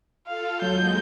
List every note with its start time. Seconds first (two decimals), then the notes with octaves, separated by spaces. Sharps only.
0.27 F4 A4 F5
0.62 D#2 F#3 G#3 D#4 G6